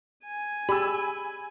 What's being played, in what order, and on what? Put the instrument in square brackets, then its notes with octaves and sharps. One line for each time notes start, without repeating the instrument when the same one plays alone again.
[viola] G#5
[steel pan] G4 G#4 D5 [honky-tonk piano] B5 E6